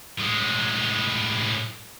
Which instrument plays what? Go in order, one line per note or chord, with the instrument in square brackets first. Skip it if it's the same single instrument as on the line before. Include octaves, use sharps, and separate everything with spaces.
[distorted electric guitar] A2 G#3